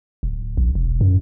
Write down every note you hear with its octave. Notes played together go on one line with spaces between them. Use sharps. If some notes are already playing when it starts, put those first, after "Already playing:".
D1
A#1
E1
F#2